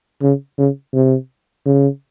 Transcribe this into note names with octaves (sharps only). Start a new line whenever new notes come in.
C#3
C#3
C3
C#3